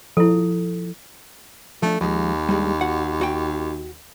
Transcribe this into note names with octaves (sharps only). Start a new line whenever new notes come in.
F3 E4 A4
F3 A3 D4
D#2 F3 G#3
G3 G#3 D4
F#4 F#5
F#4 G5